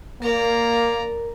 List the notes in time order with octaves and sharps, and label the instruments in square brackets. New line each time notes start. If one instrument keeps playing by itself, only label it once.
[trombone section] A#3 [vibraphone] A#4 [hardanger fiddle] D5 A#5